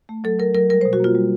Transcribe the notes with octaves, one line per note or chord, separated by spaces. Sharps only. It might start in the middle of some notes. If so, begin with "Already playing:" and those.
A3
F#3 A4
F#3 A#4
F#3 A#4
G3 A#4
C5
B2
F#4
A#3 F4
G3